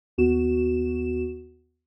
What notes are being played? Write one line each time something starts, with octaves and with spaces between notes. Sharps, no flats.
D#2 B3 F#4 E7